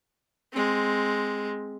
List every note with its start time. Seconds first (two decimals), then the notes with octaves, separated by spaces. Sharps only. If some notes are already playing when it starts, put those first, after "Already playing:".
0.53 G#3 C4